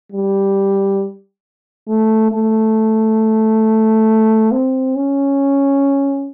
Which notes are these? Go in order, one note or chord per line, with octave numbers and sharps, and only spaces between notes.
G3
A3
A3
C4
C#4